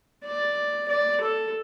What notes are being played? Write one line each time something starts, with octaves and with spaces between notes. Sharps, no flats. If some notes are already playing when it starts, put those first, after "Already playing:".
D5
D5
A4